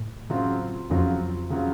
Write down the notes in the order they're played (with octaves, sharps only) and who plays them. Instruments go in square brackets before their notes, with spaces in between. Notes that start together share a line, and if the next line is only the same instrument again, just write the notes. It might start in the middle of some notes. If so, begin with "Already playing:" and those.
Already playing: [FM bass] A2
[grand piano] C#3 F#3 C4 F4
[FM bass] F2 [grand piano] C#3 F#3 C4 F4
[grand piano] C#3 F#3 C4 F4